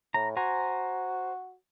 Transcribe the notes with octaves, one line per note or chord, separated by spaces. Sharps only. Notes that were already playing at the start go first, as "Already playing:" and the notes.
A2 A#5
F#4 C5 G#5 A#5